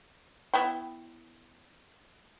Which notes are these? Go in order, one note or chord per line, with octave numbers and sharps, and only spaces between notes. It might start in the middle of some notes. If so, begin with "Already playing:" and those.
B3 E4 G5